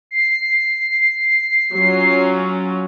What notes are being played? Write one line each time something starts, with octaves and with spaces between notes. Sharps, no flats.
C7
F#3 C#4 F4